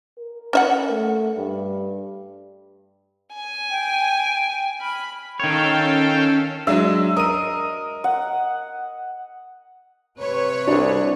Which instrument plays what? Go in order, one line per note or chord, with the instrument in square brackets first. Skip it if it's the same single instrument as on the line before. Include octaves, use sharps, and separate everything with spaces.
[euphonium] A#4
[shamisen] C#4 E5 F#5
[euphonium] A3
G2
[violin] G#5
[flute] G5
[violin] B5 [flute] F6
[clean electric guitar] D#3 C#5 [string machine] C#4 [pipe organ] A4 F5 G5
[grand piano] F#3 G#3 D4 [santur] E5
[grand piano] A#4 D#7 [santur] D#5
[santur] F#5
[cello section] C3 B4 C#5
[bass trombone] C2 [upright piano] D4